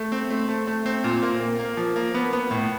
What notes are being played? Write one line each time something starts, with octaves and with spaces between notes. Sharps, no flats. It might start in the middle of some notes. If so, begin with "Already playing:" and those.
Already playing: A3
C4
A3
A3
A3
C4
A#2
A#3
A#3
A#3
F3
A#3
B3
B3
A2